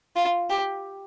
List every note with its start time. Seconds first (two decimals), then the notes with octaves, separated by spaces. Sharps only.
0.16 F4
0.50 G4